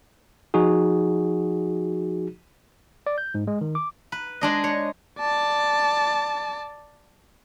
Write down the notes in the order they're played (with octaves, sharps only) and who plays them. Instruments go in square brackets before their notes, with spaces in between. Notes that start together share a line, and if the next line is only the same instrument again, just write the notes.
[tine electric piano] F3 D#4 F#4 G#4
D5
G6
G#2
G#3
D#3
D6
[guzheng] B4
G#3 D4 D#5
C#5
[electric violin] D5 A5